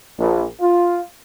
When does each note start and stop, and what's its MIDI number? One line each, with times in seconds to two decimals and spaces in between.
0.18 0.44 34
0.60 1.00 65